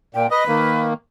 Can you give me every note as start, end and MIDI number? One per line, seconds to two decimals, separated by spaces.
0.15 0.27 46
0.15 0.30 79
0.31 0.81 71
0.31 0.44 75
0.48 0.93 51
0.48 0.93 58